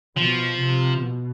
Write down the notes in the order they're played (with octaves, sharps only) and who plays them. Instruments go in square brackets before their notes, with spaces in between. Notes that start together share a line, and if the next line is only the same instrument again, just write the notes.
[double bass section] B2 [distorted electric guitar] F3
[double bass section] C3
B2